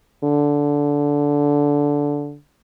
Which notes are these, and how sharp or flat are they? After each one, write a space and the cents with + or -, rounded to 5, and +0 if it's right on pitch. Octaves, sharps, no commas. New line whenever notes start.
D3 -15